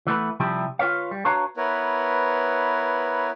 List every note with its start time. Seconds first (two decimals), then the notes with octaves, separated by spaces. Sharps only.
0.07 E3 A3 B3 B4
0.40 C3 F3 G3 E4 G4
0.79 F4 B4 C#5 F5
1.11 G3
1.25 D4 F#4 B4 C#5 F5 A#5
1.57 B3 E4 A#4 B4 C#5